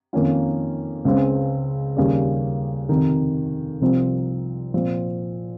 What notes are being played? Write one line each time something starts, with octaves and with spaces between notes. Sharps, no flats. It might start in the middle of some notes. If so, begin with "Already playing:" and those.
F2 D#3 A#3 C#4 F4
C#2 C#3 G#3 C4
D#2 C#3 G3
F2 C3 D#3
C2 C3 F3 C4
A#2 F3 C4